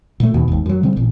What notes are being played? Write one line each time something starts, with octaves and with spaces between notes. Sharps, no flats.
A#2 A3
D#2 B2
G#1 D#2
F#2 F#3
C#3 G3 C4
A1 A#2